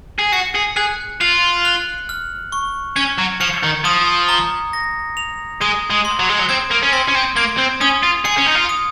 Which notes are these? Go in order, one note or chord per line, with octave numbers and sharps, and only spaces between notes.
G#4
F#4 C#7
G#4
G#4 F#6
F4 F#7
F#6
F6
C#6
C#4 G#6
F#3
F3 C#7
D#3
F3 D#6
A#5
A#6
F7
G#3 D#6
G#3
C6
F#3
G#3
F#3
C4 G#6
A#3
C#4
C4 C6
C#4
C4
A#3 G#6
C4
C#4 D#6
F4
G#4 C#7
C#4
D#4
F4
D#6